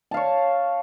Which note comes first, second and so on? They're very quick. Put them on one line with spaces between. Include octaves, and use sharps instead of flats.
A5 F5 C#5